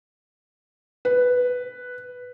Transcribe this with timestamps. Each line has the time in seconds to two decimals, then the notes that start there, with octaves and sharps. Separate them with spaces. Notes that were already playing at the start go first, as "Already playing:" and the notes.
1.05 B4